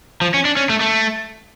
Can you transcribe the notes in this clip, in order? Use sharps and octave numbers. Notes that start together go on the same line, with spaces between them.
F3
C#4
D4
C#4
A3
A3